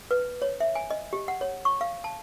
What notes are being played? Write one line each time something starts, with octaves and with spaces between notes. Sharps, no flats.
B4
C#5
E5
G#5
D#5
G4
F#5
C#5
C#6
F5
A5